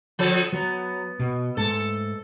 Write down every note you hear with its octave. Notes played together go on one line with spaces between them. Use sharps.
F3 A4
F#3 B3
B2
G#2 A3 A4